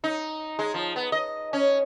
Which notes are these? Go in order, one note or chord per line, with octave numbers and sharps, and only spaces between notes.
D#4
G#3
F3
B3
D#5
C#4